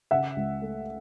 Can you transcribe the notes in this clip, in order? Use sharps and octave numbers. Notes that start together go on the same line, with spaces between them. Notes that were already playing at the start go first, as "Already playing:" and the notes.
C#3 E5 F#5
C#2
A3